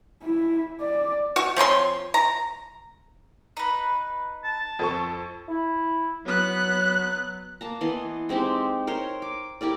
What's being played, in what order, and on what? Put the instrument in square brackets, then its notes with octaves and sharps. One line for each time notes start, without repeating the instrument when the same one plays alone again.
[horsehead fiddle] E4
D5
[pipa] F#4 C#6
F3 C4 C#5 C6
A#5
[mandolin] D#4 B4
[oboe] A5
[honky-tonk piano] F2 A4 C#6
[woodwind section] E4
[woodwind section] F#3 [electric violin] B3 F#6
[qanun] A#3 A5 A#5
E3 B3 D#5 C6
G#3 C4 D#4 G4
A#4 C5 C#5 C6
D6
E4 G4 A#4 D5